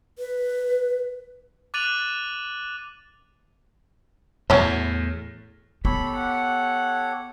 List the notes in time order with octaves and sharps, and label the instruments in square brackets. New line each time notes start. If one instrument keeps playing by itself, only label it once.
[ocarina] B4
[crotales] D6 F#6 A6 D#7 F7 F#7
[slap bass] E2 A2 [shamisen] F#3 C#4 E4 [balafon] C#5
[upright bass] B3 [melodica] G4 A4 C#5 [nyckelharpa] B5
[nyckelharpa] F#5